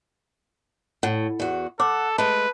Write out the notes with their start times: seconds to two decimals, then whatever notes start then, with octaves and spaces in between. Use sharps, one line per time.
1.03 A2 F#5
1.40 E2 F#4
1.80 A4 C#5 F#5 D6
2.18 G#3 A3 B4 A5